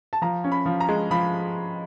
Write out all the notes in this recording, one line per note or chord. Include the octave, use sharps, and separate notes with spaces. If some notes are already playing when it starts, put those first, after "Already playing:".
A5
F3 A#5
C#4
B5
F3
A#5
G#3
F3 B5